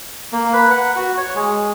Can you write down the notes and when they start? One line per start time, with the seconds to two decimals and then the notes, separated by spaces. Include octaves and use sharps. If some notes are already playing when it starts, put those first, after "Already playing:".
0.33 A#3
0.53 B4
0.71 F#5
0.96 F#4
1.18 C#5
1.35 G#3